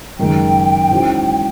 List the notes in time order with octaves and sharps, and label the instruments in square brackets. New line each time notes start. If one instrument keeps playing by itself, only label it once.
[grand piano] F#1 F#2 D#3 G#3 [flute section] G5
[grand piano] G#2 E3 G#3 C#4 F#4